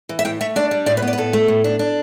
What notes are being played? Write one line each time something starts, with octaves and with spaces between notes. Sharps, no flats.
E3
E5
A2 G5
A3 E5
D4 D5
G3
A2 D5
B4
B3
D5
B4
A2 A4
A3
A2
D4
D4